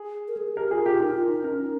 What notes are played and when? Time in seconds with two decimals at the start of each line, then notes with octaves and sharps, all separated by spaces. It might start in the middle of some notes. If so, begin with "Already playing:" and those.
Already playing: G#4
0.28 A#4
0.37 G#4
0.47 G#4
0.57 G4 A#4
0.71 F4 G#4
0.86 F4 G4
1.00 D#4 A#4
1.15 F4
1.29 D#4
1.44 C#4 A#4